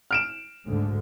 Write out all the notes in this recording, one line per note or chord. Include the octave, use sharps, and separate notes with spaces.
F6 D7 E7
D2 G#2 D3